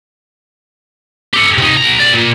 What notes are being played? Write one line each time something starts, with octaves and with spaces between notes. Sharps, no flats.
G4 A4
C3 D#4
B1 A#5
B1 D5
A#2